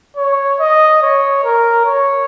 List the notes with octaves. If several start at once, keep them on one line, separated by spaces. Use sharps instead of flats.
C#5
D#5
C#5
A#4
C#5